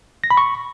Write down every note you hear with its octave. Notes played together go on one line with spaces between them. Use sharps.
A#6
B5
C#6